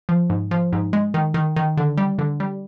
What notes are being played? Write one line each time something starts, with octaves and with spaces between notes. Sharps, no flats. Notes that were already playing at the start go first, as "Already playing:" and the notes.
F3
G#2
F3
G#2
G#3
D#3
D#3
D#3
D3
G3
D3
G3